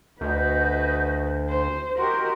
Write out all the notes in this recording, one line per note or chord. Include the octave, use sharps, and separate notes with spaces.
D2 F#4 B4 D#5 G6
C5
F#4 G4 A#4 D#5 C6